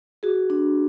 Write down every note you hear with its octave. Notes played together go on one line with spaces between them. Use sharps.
F#4 G#4
D4